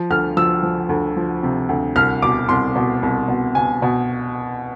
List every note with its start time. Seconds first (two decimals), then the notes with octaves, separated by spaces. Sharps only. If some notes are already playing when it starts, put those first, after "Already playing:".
Already playing: F3
0.10 D2 F6
0.37 F3 E6
0.63 F3
0.89 D2
1.17 F3
1.43 C3
1.69 D2
1.96 C2 F6
2.22 B2 D6
2.49 C2 C6
2.76 B2
3.03 C2
3.28 B2
3.55 B2 G#5
3.82 B2